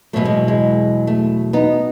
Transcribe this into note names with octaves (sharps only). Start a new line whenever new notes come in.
E2 B2 F#3 A3
G#3
G#3
A3
B3 D#4